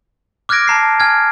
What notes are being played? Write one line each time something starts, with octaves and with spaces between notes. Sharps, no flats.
D6 F6 F#6 G#6 A#6 D7
A5 A#5 C7
G#5 F6 G#6